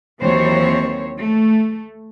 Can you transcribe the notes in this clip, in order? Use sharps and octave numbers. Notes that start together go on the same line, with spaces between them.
D#2 E3 F#3 C4 C5 C#5
A3